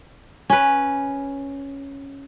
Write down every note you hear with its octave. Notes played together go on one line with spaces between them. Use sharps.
C#4 B4